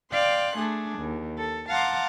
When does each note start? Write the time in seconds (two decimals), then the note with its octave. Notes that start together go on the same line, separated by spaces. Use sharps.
0.11 D5 F5 G5 C6 F#6
0.57 A3 D4 G#4
0.98 D#2
1.37 A4
1.69 F5 F#5 A5 A#5 C6 D6